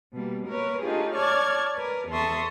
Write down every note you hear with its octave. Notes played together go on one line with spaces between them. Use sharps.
B2 G3 A#3
A#3 A#4 B4 C#5
A3 D4 D#4 F4 G4 G#4
C#5 D5 A5 C#6 F6 G#6
A#4 B4
E2 A4 E5 C6 C#6 D#6